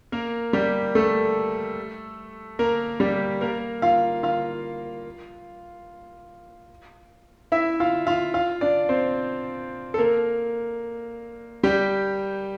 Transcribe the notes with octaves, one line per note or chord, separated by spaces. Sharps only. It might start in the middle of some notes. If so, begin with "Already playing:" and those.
A#3 A#4
G3 G4
A3 A4
A#3 A#4
G3 G4
A#3 A#4
F4 F5
F4 F5
E4 E5
F4 F5
F4 F5
F4 F5
D4 D5
C4 C5
A4
A#3 A#4
G3 G4